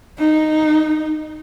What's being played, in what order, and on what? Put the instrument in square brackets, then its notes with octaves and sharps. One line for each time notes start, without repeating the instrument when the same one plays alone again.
[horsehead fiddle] D#4